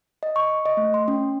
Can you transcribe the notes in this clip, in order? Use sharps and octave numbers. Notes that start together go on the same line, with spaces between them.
D#5
C#6
D#5
A3
C6
C#4